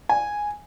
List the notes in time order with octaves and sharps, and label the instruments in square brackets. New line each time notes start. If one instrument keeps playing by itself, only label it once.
[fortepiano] G#5